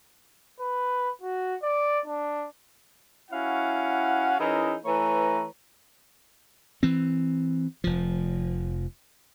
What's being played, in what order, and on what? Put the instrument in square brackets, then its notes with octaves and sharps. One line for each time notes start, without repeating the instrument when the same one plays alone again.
[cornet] B4
F#4
D5
D4
[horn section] C#4 E4 F#4 F5 F#5
E3 C#4 D#4 E4 G#4 A#4
E3 A3 B4 C#5 A#5
[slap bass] E3 C4
F1 F3